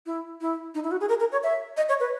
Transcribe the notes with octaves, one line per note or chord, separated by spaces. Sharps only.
E4
E4
D#4
E4
F#4
G#4
A#4
A#4
C#5
E5
D#5
C#5
B4